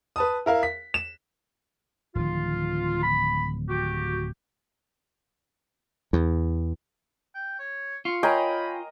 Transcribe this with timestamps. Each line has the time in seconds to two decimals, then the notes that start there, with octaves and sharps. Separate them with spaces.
0.16 B4 A5 D#6
0.46 E4 A#4 F5
0.63 B6
0.94 E7
2.15 D1 D#3 F3 F4
3.03 B5
3.69 F#4 G4
6.13 E2
7.35 G5
7.59 C#5
8.05 F4 C#6
8.23 A#4 C#5 D#5 G5 G#5 B5